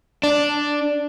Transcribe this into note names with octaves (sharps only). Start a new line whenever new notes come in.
D4